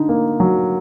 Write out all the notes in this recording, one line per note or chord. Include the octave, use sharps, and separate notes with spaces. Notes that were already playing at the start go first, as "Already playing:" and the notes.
Already playing: D3 D#4
A#3
F#3